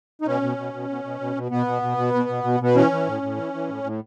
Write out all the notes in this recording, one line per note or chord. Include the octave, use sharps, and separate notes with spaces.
D#4
B2 C#4
B2
B2
B2
B2
B2
B2
B2
B2 B3
B2
B2
B2
B2
B2
B2
B2 B3
E3 C#4
E3
A2
A2
E3
E3
A2
A2